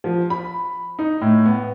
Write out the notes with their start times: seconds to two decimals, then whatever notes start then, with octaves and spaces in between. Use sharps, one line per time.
0.04 F3
0.30 B5
0.99 D#4
1.21 A2
1.46 B3